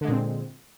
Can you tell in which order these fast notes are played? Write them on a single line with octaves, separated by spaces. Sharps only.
D3 G#3 A#2 C4